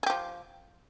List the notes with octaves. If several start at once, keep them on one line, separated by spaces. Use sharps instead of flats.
F3 G4 G#4